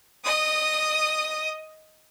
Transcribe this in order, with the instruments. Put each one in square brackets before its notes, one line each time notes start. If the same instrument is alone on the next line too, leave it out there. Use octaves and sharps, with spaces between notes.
[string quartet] D#5 D#6